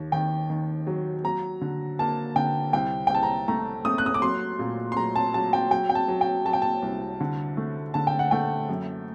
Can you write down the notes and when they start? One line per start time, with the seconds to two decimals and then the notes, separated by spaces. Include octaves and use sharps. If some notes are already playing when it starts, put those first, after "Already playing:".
Already playing: D#2
0.12 D#3 G5
0.50 D#3
0.87 F#3
1.24 F#3 A#5
1.61 D3
1.99 A#3 A5
2.36 D3 G5
2.73 C2 G5
3.07 G5
3.10 C2 A5
3.23 A#5
3.48 A3 A#5
3.85 A3 D#6
3.98 F#6
4.06 D#6
4.14 D6
4.22 F#3 C6
4.59 A#2
4.92 C6
4.97 F#3 A#5
5.16 A5
5.34 F#3 A5
5.53 G5
5.71 F#3 G5
5.90 G5
5.95 A5
6.08 F#3
6.21 G5
6.45 F#3 A5
6.53 G5
6.62 A5
6.82 C2
7.20 D3
7.57 A3
7.94 D3 A5
8.07 G5
8.19 F#5
8.31 A3 G5
8.69 F#2